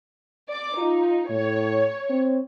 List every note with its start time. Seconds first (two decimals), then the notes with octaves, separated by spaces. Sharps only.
0.49 D5 D6
0.78 D#4 F4
1.30 A2 C#5
2.10 C4